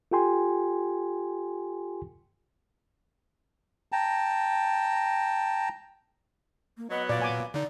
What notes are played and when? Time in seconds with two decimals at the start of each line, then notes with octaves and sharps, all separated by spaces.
0.11 F4 G4 A4 G5 G#5 C6
3.92 G5 A5 A#5
6.77 A#3
6.90 F#3 B3 D#5
7.09 A#2 D5 F5
7.22 G#5 D6
7.54 D3 D#4 D5